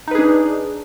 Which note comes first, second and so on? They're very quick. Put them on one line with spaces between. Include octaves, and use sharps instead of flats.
D#4 B4 G#4 D4